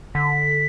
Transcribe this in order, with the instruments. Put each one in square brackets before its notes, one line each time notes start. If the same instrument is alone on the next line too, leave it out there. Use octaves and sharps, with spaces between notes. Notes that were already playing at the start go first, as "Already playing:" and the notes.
[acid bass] D3 [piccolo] B6